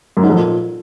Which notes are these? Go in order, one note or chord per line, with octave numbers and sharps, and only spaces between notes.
F#2
G#2
F2
A#2